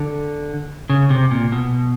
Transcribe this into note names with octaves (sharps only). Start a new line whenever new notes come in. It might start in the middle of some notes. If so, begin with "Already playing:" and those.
Already playing: D3
C#3
C3
A#2
B2